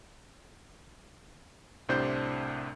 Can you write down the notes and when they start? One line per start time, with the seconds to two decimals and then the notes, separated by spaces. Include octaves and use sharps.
1.89 C2 A2 C3 D4 C5 G6